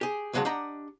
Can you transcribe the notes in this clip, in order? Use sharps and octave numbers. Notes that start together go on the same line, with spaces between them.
G4 G#4
C#2 G#2 F#3 G#3 F#5 A5
D4 G4 D#5 F#5 A#5